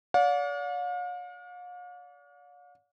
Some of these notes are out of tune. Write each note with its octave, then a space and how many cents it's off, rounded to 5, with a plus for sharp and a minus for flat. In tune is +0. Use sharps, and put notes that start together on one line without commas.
D5 -40 F5 +45